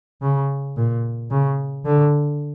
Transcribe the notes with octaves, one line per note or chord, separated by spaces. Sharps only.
C#3
A#2
C#3
D3